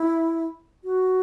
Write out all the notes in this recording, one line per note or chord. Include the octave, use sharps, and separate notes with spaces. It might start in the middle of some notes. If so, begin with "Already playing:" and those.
Already playing: E4
F#4